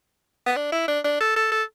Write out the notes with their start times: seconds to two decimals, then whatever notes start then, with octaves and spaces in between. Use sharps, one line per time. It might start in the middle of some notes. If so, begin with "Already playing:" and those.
0.46 B3
0.56 D4
0.72 E4
0.88 D4
1.04 D4
1.20 A4
1.36 A4
1.52 A4